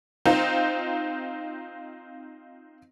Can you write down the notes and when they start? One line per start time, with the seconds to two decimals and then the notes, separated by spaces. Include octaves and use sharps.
0.26 C4 D#4 F4